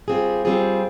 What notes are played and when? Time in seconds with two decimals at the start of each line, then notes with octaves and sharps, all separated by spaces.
0.08 G3 C4 F4 G#4
0.45 G3 C4 F4 G#4